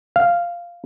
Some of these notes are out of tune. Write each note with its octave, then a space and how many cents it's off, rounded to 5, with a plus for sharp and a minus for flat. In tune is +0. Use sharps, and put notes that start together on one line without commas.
F5 -5